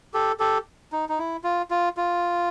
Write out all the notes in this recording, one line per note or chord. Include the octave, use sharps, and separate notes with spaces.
G4 A4
G4 A4
D#4
D#4
E4
F4
F4
F4